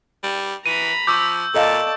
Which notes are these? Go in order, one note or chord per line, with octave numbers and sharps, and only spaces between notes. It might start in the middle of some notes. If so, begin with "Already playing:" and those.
G3
E3 A#5 B5 D#7
F3 C#6 D6 E6 G6
A#2 A4 D5 D#5 F5 A5